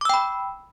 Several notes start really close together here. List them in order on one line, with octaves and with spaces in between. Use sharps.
D6 E6 G5 B5